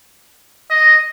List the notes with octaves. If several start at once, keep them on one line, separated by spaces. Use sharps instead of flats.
D#5